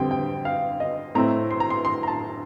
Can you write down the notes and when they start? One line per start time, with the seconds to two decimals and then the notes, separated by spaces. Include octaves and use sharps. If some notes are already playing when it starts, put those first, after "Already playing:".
Already playing: F2 D3 G3 C4 G5
0.11 G5
0.45 F5
0.80 D#5
1.15 A2 A3 C4 A#5
1.51 C6
1.60 A#5
1.70 C6
1.85 C6
2.03 A#5
2.07 A5